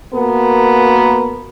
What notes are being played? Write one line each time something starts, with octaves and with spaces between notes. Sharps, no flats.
A#3 B3 F#4 A#4